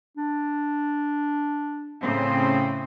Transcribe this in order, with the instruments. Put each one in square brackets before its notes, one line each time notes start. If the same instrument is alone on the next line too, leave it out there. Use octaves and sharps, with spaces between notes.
[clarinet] D4
[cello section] A2 C#3 C4